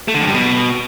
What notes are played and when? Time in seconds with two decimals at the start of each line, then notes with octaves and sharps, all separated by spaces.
0.08 A3
0.14 D3
0.21 F2
0.27 G2
0.33 B2